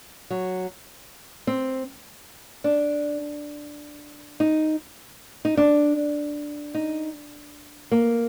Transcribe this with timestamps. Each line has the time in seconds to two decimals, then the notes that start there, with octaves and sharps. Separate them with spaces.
0.30 F#3
1.47 C4
2.64 D4
4.40 D#4
5.45 D#4
5.57 D4
6.75 D#4
7.92 A#3